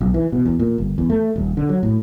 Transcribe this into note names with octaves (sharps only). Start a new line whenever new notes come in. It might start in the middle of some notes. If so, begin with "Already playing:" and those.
B1
E3
B2
E2
A#2
G1
E2
A3
D#1
D3
F#3
A2